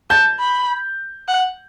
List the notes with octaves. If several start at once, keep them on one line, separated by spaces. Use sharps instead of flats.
A5 G6
B5
F#5